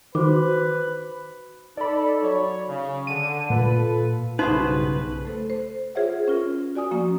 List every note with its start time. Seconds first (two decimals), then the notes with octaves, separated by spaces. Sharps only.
0.15 D#3 F#4 B4 C5 D6
1.77 D#4 A4 D5 B5
2.22 F#3 C#5
2.68 C#3
3.07 D3 D#7
3.50 A#2 F4 A4 B4
4.39 B1 G2 C#3 D#4 F#4 G#4 B4 C5
5.25 A3 A4 C5
5.50 C5
5.95 F4 G#4 C5 C#5 E5 F#5
6.28 C#4 F4 A#4
6.75 F#4 D5 G#5 D#6
6.91 F3 A#3 C#4